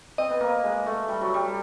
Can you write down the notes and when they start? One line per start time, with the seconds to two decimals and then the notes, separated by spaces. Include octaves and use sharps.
0.18 C4 D#5
0.30 B3
0.41 A#3
0.64 G#3
0.86 A3
1.08 G3
1.21 F#3
1.34 G3